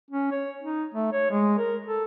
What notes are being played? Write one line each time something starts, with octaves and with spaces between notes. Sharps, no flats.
C#4
C#5
D#4
A3
C#5
G#3
A#4
A4